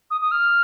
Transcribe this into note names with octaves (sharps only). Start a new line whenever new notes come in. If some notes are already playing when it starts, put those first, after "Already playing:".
D#6
D#6
F6